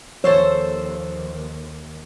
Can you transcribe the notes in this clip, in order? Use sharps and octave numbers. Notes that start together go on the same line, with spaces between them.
D#2 F3 A4 C5 C#5 E5